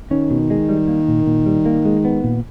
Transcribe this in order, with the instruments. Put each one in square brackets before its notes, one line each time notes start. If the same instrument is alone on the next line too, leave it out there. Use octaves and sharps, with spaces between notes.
[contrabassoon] D#3 [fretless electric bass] C#4
[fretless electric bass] B2
G#3
G3
A#3
A#2
A#2
G3
A#3
G#3
B3
A#2